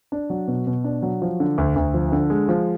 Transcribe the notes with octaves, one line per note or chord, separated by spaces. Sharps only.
D4
F#3
B2
B2
D4
F#3
F3
D3
D2
D2
F3
D3
G#3
F3